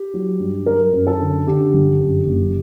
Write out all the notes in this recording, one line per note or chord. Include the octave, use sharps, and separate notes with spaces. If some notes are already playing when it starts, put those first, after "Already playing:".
Already playing: G4
F#3
G2
F#3 A#4
F#2
A4
D3
D3 G4
G1
F#2
F#1